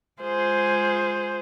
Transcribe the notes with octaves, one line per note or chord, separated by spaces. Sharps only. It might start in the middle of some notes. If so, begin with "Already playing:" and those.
G#3 F4 G#4 C5